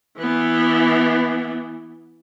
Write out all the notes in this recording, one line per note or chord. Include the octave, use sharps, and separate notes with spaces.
E3 B3